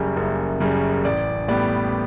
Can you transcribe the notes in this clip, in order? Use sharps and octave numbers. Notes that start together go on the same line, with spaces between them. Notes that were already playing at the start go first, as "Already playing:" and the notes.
Already playing: F#1 F#2 C#3 G3
F#1
F#2 C#3 G3
A1 D5
A2 G3 B3 D5